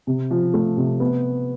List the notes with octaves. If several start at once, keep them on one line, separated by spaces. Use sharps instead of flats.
C3
F3
A3
C3
B3